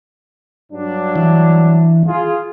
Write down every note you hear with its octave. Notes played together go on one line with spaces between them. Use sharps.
G2 F#3 D4
E3
F4 G#4